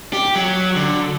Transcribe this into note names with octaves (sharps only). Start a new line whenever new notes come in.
G4
F#3
D3